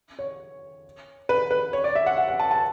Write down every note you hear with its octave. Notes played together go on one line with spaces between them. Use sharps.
C#5
B4
B4
C#5
D5
E5
F#5
F#5
F#5
A5
A5